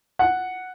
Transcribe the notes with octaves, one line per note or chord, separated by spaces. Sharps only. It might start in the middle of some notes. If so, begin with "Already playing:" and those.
F#5